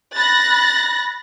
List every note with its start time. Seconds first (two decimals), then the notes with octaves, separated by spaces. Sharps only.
0.14 B5 F#6 A6 A#6